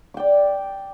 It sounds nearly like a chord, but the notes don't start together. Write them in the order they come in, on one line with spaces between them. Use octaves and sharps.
D6 G5 D5